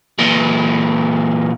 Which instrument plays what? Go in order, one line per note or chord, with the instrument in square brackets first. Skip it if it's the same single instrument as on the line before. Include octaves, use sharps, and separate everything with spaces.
[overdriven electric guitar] A#2 E3